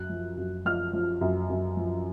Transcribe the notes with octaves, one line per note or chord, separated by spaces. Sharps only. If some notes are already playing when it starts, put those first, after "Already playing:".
Already playing: F#2 F#6
F3
F#2
F3 F6
F3
F#2
F#2
F3